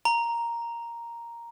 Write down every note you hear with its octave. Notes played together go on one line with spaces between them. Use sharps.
A#5